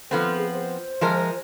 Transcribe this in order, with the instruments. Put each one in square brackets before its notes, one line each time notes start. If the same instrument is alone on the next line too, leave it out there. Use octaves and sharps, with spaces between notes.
[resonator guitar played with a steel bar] F3 B3 C4 [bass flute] A4
[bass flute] G#4
C5
[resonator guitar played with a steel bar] F3 G#3 A#4